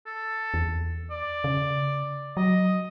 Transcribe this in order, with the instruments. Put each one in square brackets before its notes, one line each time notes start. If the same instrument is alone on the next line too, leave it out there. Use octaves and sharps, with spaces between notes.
[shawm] A4
[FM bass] E2
[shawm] D5
[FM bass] C#3
[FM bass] F#3 [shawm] D#5